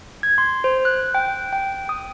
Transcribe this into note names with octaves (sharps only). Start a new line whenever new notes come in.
G#6
C6
C5
F#6
G5
G5
D#6